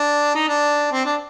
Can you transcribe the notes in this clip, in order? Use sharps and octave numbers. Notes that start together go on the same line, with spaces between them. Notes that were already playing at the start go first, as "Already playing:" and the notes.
Already playing: D4
D#4
D4
C4
D4